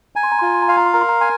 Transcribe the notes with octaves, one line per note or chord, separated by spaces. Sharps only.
G#5 A#5
C6
A#5
C6
F4 A#5
C6
A#5
F5 C6
A#5
C6
A#4 A#5
C6
A#5
G#5 C6